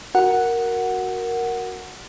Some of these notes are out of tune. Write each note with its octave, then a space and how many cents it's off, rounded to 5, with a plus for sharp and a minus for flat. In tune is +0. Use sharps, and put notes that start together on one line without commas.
F#4 +5 A#4 +0 F#5 +0